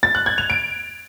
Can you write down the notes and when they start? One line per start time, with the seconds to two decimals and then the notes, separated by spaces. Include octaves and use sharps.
0.03 A6
0.15 F#6
0.26 G#6
0.38 F7
0.50 D7